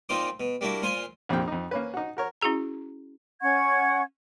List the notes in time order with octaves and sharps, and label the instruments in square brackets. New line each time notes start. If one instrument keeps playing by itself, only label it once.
[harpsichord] A#2 C4 D#4 F4 C5 D6
B2
G3 A#3 D4 E4 F#4
A#2 F4 C5 F5 G#5
[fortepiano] A#1 F2 C3 A#3 G5
F2 D#4
A#3 C#4 B4
D#4 F#4
F#4 A#4 C#5
[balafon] C#4 E4 F#4 G#4 A#5
[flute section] C#4 F#5 C#6 G#6